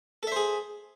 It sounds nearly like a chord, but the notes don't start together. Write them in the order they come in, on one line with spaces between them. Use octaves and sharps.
A4 E5 C5 G#4